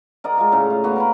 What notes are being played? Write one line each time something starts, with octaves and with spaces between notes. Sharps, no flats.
A#4 D5 D#5 F#5
G#3 F4 A#4
A2 C#3 A#5
F4
A#3 B3 F#4 D6
A#4 B4 B5